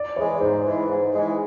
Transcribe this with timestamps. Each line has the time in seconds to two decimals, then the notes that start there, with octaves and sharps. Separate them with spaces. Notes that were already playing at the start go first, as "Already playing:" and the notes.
Already playing: D5
0.16 E3 G#3 C#5
0.40 G#2 C5
0.65 E3 G#3
0.89 G#2
1.13 E3 G#3